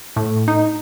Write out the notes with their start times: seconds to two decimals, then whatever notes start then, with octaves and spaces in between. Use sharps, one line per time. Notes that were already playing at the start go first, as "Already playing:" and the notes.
0.16 A2
0.48 D#4